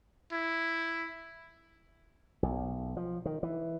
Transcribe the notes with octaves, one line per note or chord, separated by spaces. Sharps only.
E4
B1
F3
D#3
E3